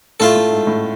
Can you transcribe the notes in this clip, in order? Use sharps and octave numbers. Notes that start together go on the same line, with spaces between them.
A2 A3 F4 A4
A2
G#2
A2